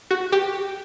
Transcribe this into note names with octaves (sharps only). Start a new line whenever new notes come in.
F#4
G4